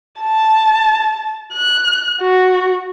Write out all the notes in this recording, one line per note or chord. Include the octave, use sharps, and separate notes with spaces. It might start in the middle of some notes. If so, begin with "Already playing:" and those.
A5
F#6
F#4